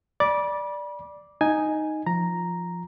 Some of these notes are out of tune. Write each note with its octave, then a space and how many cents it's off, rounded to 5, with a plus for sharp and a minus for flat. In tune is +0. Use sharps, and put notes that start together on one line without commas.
D5 +0 B5 -35 D6 -5
D#4 +0 G#5 +0
F3 +0 A#5 +0